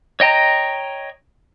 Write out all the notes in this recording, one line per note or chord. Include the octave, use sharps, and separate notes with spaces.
C#5 D#5 G5 A#5